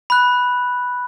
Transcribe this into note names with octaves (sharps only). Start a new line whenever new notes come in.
B5 F#6